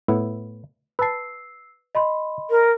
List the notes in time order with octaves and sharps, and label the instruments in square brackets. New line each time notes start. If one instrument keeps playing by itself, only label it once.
[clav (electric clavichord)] A2 B3 E4
[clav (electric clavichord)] B4 A5 [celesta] E6 C7
[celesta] D#5 B5 C6
[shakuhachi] A#4